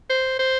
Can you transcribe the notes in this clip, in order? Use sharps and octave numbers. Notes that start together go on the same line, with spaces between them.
C5
C5